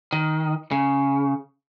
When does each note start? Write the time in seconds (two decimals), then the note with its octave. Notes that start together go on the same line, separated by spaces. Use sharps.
0.13 D#3
0.71 C#3